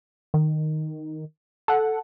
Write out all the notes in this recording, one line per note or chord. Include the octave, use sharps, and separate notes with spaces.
D#3
A4 F#5